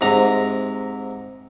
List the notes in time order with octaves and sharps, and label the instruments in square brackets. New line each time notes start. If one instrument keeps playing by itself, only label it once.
[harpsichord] G#2 C3 A#5